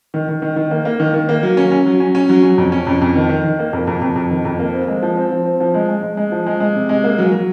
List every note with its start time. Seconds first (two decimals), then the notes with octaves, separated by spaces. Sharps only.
0.14 D#3
0.28 D#3
0.42 D#3
0.56 D#3
0.71 A#3
0.85 A#3
1.00 D#3
1.14 D#3
1.29 A#3
1.43 F#3
1.57 C#4
1.72 C#4
1.86 F#3
2.00 C#4
2.15 C#4
2.29 F#3
2.43 C#4
2.58 F2
2.72 C#4
2.87 F2
3.02 F2
3.15 D#3
3.30 D#3
3.44 D#3
3.59 A#3
3.73 F2
3.87 F2
4.02 F2
4.16 F2
4.30 D#3
4.45 F2
4.59 A#3
4.74 C4
4.88 G#3
5.03 F3
5.17 C4
5.31 F3
5.46 C4
5.60 F3
5.74 G#3
5.89 G#3
6.03 G#3
6.17 G#3
6.32 F3
6.46 G#3
6.60 G#3
6.75 C3
6.89 G#3
7.04 A#3
7.18 F#3
7.32 F#3